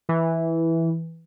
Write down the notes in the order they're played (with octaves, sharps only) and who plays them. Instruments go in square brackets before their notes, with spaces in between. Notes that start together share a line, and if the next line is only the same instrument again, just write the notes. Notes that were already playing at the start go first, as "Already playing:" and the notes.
[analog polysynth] E3